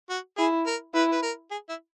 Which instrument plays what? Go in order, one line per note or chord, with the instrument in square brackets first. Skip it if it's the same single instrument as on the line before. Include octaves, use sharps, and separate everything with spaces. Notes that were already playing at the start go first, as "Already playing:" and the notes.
[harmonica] F#4
[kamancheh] E4 [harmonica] G#4
[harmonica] A#4
[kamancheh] E4 [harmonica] B4
[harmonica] B4
A#4
G#4
E4